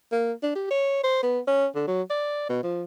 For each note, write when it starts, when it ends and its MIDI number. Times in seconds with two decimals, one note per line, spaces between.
0.12 0.32 58
0.43 0.54 62
0.55 0.66 67
0.71 0.99 73
1.03 1.20 72
1.23 1.39 59
1.47 1.66 61
1.75 1.86 50
1.87 2.02 54
2.10 2.48 74
2.49 2.60 47
2.63 2.85 53